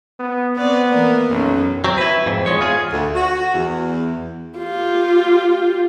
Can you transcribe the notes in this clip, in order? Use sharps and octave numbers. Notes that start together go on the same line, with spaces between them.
B3
B3 C4 D5
E3 A#3 A#4
B1 F#2 F#3 C#4
F#3 C4
E4 B4
F2 G#2
E2 A#2 G#3 C#5
F4 G#4
D2
F#4
E2
F4 G4